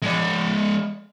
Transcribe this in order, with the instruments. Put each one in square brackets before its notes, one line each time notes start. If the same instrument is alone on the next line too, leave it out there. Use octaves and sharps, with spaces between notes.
[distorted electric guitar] G#3 D5